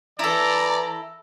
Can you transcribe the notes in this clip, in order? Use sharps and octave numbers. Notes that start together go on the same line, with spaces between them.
E3 E4 A4 D5 A#5